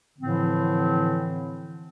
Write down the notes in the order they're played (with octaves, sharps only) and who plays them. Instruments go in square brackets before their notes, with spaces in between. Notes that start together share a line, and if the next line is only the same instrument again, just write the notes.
[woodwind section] A2 D3 E3 F3 C4